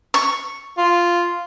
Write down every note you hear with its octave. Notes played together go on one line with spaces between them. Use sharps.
C#6
F4